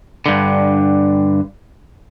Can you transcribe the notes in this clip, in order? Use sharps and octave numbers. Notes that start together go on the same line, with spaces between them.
G2 D3